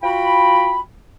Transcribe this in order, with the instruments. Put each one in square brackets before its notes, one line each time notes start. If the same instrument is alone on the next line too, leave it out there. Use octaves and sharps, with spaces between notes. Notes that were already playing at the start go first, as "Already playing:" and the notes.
[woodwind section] F4 F#4 G5 B5